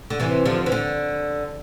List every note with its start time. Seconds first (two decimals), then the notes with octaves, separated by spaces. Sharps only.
0.10 D3
0.20 C3 E3
0.45 D3 F3
0.66 E3
0.72 D3